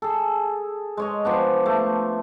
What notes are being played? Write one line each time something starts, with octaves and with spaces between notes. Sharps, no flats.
G#4 A4
G#3 C#5 D#5
F3 B3 D4
A3